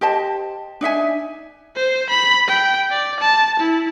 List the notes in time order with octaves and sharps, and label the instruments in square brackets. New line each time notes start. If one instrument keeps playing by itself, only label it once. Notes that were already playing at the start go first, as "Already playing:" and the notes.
[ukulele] G4 C5 D#5 A5
D4 D#4 E5 G#5
[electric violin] C5
B5
G5
D5
A5
E4